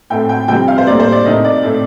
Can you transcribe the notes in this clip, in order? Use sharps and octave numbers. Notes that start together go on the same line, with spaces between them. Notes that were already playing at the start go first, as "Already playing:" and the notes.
A2 A3 C4 G5
G5
F2 C3 G3 C4 G5
F5
C5
A2 G3 A#3 D5
C5
D5
C3 D#3 A3 D#5
D5
A2 A3 C4